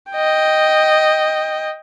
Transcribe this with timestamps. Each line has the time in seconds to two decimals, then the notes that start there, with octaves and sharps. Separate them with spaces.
0.12 D#5 G5